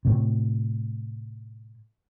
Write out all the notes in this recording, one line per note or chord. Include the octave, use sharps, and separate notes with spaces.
A2 C3